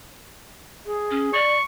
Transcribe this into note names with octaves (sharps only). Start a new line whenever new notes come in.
G#4
C#4
D5 C#6